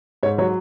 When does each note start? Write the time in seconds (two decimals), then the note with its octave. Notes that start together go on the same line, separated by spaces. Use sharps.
0.23 G#2 C#5
0.38 F#3 C#5